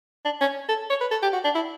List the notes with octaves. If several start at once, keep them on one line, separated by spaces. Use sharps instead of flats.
D4
C#4
A4
C#5
B4
A4
G4
F#4
D4
E4